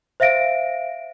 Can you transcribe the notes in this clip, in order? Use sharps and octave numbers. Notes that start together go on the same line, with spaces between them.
C5 E5 F5 A#6 D7